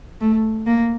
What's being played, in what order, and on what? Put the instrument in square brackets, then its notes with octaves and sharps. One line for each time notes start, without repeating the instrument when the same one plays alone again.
[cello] A3
A#3